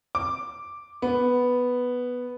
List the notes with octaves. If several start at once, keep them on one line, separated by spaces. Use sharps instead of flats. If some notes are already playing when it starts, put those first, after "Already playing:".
D6
B3